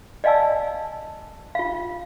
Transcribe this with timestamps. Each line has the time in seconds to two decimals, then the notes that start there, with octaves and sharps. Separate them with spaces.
0.24 D5 D#5 F5 G#5 A5 E6
1.55 F4 F5